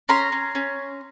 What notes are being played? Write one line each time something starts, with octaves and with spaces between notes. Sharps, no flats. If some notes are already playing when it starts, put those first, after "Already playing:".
C#4 A#5 C6
C#4
C#4